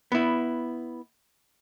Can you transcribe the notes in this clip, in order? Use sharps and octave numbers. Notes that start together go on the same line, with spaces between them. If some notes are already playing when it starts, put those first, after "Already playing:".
B3 E4